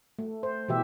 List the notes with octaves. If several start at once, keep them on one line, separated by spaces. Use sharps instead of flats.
A3
C5
B2 E3 G4 E5